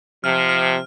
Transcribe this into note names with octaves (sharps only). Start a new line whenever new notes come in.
C3 F3 F6
F6